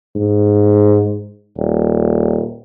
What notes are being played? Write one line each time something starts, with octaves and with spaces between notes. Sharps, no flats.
G#2
D#1